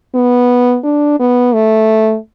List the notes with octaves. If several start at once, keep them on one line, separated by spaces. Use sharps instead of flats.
B3
D4
B3
A3